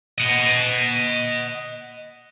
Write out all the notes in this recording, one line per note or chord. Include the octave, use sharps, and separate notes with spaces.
D#5 F#5